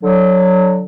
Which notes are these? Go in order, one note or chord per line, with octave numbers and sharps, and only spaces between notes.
D3 F#3